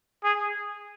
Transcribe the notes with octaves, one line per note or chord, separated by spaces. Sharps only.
G#4